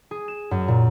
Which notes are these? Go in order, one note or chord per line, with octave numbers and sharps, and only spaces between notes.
G#4
E7
F#2
A#2